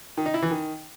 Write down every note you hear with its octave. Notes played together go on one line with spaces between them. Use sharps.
D#3
D#4
E4
E3
D#3